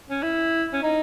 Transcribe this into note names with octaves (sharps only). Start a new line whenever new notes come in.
C#4
E4
C#4
D#4